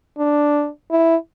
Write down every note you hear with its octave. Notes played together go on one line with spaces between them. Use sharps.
D4
E4